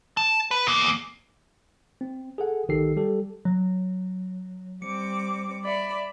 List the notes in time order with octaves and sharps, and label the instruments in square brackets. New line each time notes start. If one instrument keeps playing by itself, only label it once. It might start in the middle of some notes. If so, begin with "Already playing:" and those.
[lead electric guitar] A5
B4
E2 A#3
[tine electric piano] C4
G#4 A4 F#5
B1 D#3 G4 A4 E6 C7
G3 G4 A4
[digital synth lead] F#3
[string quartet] G3 C4 D6 [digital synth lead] C#7
[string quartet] D5 E5 B5